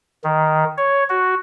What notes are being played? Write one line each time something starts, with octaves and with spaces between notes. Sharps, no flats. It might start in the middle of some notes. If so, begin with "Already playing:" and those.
D#3
C#5
F#4